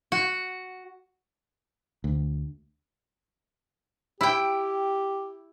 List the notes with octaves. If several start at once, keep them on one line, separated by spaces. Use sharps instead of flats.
F#4
D2
E4 G4 G5